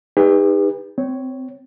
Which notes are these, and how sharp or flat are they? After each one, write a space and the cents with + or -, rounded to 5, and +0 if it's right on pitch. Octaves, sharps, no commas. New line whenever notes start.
D#4 +0 G4 +45 B4 +0
C4 -20 C#5 +0